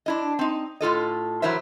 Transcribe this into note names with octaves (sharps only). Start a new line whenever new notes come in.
D4 E4 D#5
C4 D#4
A2 F4 A4 D#5
E3 F#3 E4 A#4 C5 E5